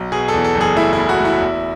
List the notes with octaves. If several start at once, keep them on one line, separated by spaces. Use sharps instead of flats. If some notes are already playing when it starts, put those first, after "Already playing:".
Already playing: B1
B2 G#4
A4
E2
A4
F#1
G#4
A3 E4
E4
F#1
F#4
A3 E4
E2